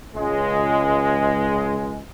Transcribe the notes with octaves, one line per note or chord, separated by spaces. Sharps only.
C#2 G#3